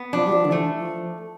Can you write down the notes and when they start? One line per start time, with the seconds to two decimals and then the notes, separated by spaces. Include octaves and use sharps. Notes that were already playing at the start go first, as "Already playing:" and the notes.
Already playing: B3
0.13 F3 D4
0.27 G3
0.32 F3
0.45 D3
0.51 E3 A3
0.78 F3